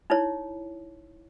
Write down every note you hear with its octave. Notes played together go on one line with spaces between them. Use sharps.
D#4 E4 C#5